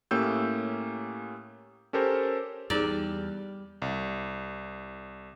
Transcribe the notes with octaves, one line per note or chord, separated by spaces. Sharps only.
A2 A#3 C#4 G4 E6 G6
C#4 G4 A4 A#4 C5
E2 G3 D#4 G#4 D5
C2